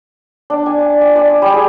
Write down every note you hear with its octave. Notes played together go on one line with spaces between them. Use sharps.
D4
G#5
D6
G#5
D5
D#6
G3
G#4